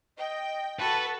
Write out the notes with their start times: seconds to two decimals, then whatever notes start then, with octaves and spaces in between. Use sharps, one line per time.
0.18 D#5 G5
0.79 F#4 A4 B4 A5